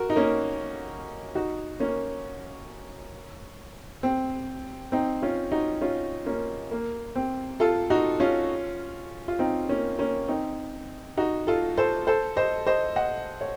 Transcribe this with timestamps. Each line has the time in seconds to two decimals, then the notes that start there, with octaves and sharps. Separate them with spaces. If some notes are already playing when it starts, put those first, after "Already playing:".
Already playing: F#4 A#4
0.10 D#4
0.16 A#3 C#4
1.35 D#4 F#4
1.80 A#3 C#4
4.03 C4
4.92 C4 D#4
5.22 C#4 F4
5.52 D#4 F#4
5.81 C#4 F4
6.26 A#3 C#4
6.71 A#3
7.16 C4
7.60 F4 A4
7.90 D#4 F#4
8.20 C#4 F4
9.28 F4
9.39 C4 D#4
9.69 A#3 C#4
9.99 A#3 C#4
10.28 C4 D#4
11.17 D#4 F#4
11.47 F4 A4
11.77 A4 C5
12.07 A4 C5
12.37 C5 D#5
12.67 C5 D#5
12.96 D#5 F#5
13.41 C#5